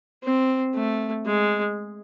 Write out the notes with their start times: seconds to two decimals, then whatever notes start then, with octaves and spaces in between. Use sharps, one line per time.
0.23 C4
0.74 A3
1.26 G#3